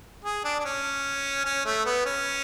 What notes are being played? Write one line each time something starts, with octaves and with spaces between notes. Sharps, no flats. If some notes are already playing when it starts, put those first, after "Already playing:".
G#4
D4
D4
C#4
C#4
A3
B3
C#4